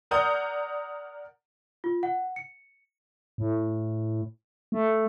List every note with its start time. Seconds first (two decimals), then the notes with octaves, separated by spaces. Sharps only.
0.11 A#4 D5 F#5 A#5 D#6 G6
1.84 F4
2.03 F#5
2.36 C#7
3.38 A2
4.72 A3